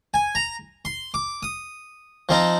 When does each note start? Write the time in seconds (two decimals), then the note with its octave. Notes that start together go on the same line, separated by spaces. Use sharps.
0.14 G#5
0.35 A#5
0.85 C6
1.14 D6
1.43 D#6
2.29 F3 C4 D#4